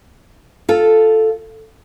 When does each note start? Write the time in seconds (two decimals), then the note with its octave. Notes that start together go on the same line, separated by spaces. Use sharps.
0.69 F4 A4